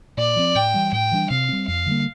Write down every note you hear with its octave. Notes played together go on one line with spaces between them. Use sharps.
A#2 D5
F3 C4
A2 G5
E3 G3
A2 G5
E3 G3 D4
C3 F5
G3 C4
F2 F5
D3 G3 A#3